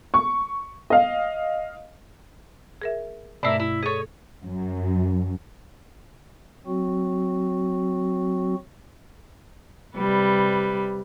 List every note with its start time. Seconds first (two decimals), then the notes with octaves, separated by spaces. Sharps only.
0.14 C#6
0.90 D#5 F5
2.82 G#4 A#4 E5
3.43 G2 B2 A3 D4 E4 A#4
3.60 E4
3.83 G#4 A4 C#5 D#5
4.45 F#2
6.67 F#3 C4 F#4
9.97 C3 G3 B4